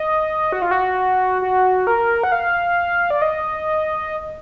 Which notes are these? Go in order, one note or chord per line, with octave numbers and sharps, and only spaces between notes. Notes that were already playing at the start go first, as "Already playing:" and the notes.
Already playing: D#5
F#4
F4
F#4
F#4
A#4
F#5
F5
D5
D#5